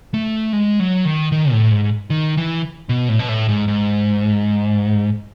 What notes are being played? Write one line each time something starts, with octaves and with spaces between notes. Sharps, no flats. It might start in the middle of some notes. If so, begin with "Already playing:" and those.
A3
G#3
F#3
D#3
D#3
A2
G#2
D#3
E3
B2
A2
B2
A2
G#2
G#2